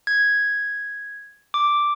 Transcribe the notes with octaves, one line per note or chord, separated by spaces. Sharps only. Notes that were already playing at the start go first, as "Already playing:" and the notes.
G#6
D6